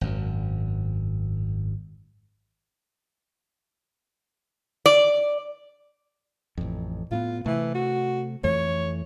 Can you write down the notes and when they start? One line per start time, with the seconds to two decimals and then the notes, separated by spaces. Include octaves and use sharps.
0.01 G#1 F#2
4.86 D5
6.58 A1 F2
7.11 A2 A#3 B3 F4
7.46 C3 E3 A3
7.75 F#4
8.44 F2 E3 A3 C#5